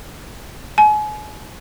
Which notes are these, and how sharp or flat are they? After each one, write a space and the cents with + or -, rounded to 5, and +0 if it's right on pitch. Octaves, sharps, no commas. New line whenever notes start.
G#5 +35